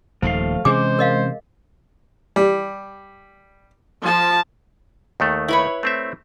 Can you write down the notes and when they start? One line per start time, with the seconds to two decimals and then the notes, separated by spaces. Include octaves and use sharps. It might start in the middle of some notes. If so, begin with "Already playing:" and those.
0.22 D#1 D#2 D#3 F3 A3 F5
0.65 C3 E3 G#3 C#4 G#4 C5 G#5 D6
0.99 A#4 D#5 F5
2.36 G3
4.02 F3 A5
5.20 D#2 D#3 A3
5.48 E4 B4 C#5
5.83 A3 C4 E5